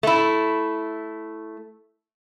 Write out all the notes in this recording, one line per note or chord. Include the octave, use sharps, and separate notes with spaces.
A3 E4